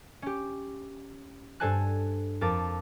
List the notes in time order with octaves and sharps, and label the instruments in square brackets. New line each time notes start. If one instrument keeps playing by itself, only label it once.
[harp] C#4 G4
G2 A4 C5 G#5 A5 F#6
F2 A#4 A5 D6 A6